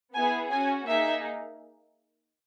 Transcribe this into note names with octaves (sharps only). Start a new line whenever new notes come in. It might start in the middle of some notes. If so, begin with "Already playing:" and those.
B3 E4 G#4 G#5
C#4 F#4 G#5
A#3 D#4 G#4 E5